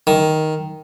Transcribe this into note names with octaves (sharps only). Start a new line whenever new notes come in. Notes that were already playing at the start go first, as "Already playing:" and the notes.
D#3